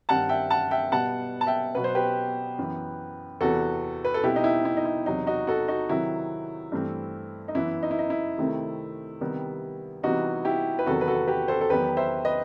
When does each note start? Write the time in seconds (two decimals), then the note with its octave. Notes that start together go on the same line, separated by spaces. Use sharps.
0.09 G2 D#3 G3 C4 F#5 A5
0.29 E5 G5
0.50 F#5 A5
0.71 E5 G5
0.92 B2 G3 B3 F#5 A5
1.41 A5
1.47 E5 G5
1.75 B2 F#3 B3 B4
1.84 C5
1.95 G4 B4
2.58 F#2 E3 B3
3.41 E2 C3 E3 B3 F#4 A4
4.05 B4
4.14 A4
4.23 B2 G3 C4 E4 G4
4.36 D#4
4.44 E4
4.65 E4
4.77 D#4
4.85 E4
5.06 E2 C3 F#3 D#4
5.27 D#4 F#4
5.47 F#4 A4
5.68 D#4 F#4
5.89 C3 D#3 F#3 E4
6.72 G2 E3 A3 C4
7.48 D#4
7.55 F#2 E3 B3 E4
7.83 D#4
7.91 E4
7.99 D#4
8.10 E4
8.38 C3 D#3 A3 C4
9.21 C3 D#3 G3 B3
10.03 C3 E3 G3 B3 D#4 F#4
10.45 E4 G4
10.79 B4
10.86 E2 C3 D#3 F#3 B3 F#4 A4
11.01 B4
11.07 F#4 A4
11.28 G4 B4
11.48 A4 C5
11.61 A4
11.70 E2 D#3 F#3 B3 G4 B4
11.97 C5 E5
12.25 B4 D#5